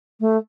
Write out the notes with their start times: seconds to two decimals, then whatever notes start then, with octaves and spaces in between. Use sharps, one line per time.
0.20 A3